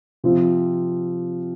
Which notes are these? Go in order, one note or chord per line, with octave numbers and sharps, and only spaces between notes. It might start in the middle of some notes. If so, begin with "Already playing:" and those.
C3 F3 C4 F4